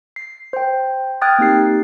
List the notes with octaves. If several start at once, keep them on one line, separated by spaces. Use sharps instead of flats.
C7
C5 G5
G5 D#6 F6 F#6 G#6 A6
A#3 C4 D#4 G4 C7